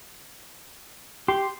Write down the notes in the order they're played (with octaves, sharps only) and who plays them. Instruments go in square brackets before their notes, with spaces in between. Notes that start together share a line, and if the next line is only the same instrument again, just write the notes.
[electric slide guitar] G4 [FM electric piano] C6